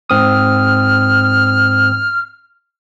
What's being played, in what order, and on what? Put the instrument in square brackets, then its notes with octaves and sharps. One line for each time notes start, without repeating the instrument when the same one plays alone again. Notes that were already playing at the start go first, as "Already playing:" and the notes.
[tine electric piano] G#2 C4 D#6 [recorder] F6